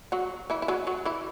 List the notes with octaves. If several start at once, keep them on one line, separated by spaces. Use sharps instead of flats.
F#3 F#4
E3 E4
E4
F#3 F#4
F#3 F#4
E3 E4